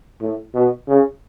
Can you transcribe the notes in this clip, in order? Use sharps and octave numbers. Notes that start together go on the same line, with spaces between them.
A2
B2
C#3